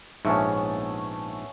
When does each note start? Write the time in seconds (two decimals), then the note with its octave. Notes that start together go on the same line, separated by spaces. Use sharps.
0.25 A#1 G#2 A3 B3 C#4